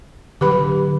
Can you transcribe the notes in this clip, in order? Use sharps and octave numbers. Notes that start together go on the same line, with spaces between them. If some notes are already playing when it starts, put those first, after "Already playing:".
D3 F#3 G4 B4 B5